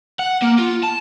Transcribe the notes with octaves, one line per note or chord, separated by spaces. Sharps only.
F#5
A#3
F4
A5